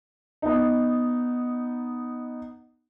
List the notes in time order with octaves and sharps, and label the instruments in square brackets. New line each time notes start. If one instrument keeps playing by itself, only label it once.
[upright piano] B3 D#4